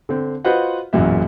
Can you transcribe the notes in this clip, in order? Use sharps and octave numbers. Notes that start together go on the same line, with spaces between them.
D3 C4
F4 F#4 B4 C5 D#5 F#5
E1 A1 F#2 A#2 F#4 E5